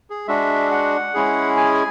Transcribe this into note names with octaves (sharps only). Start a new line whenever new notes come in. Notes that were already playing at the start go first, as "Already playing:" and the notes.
G#4
G#3 D4 F#4 E5
F#5
G#3 C#4 E4 G#4
G#5